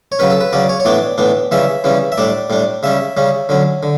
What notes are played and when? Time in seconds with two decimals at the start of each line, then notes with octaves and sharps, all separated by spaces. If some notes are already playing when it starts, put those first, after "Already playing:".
0.12 C#5
0.19 C#3 F#3 C#4 B4
0.30 A4
0.41 B4
0.53 C#3 F#3 C#4 D5
0.69 C#5
0.80 C#5
0.85 A2 E3 B3 D4 D5
1.18 A2 E3 B3 D4
1.51 C#3 E3 G3 C#4 E5
1.84 C#3 E3 G3 C#4
2.12 E5
2.17 A2 G3 D4 D5
2.50 A2 G3 D4
2.83 C#3 G3 C#4 E5
3.17 C#3 G3 C#4
3.49 D3 F#3 C#4
3.83 D3